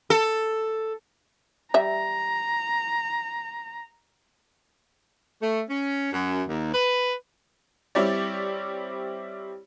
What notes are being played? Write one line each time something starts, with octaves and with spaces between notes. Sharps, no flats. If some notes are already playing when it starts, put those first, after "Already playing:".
A4
G3 E5 A#5
A3
C#4
F#2
D#2
B4
G3 C4 E4 G4 C#5 D5